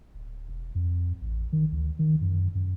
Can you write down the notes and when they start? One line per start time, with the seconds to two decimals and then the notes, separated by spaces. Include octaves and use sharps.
0.14 D1
0.49 E1
0.75 F2
1.21 A1
1.53 D#3
1.72 D2
1.99 D#3
2.21 F#2
2.55 F#2